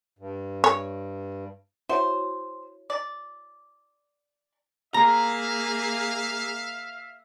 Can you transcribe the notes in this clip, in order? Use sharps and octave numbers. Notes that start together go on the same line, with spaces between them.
G2
C#5
E4 F#4 C5 C#5
D5
A#3 G#4 E5 F5 A#5